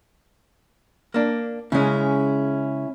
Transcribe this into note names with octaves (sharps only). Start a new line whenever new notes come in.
A#3 D4
C#3 G#3 C#4 E4